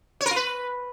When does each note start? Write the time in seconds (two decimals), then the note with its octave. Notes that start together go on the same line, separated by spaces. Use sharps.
0.21 C#5
0.26 A#4
0.31 F4
0.36 B4